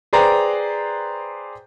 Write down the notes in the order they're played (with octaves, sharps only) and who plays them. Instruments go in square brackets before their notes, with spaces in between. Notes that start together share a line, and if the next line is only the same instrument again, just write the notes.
[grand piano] G#4 B4 C5 D5 G5 A#5